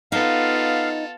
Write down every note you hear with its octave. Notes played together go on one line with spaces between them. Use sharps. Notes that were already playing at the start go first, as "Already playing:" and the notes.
B3 D#4 F4 A4 F5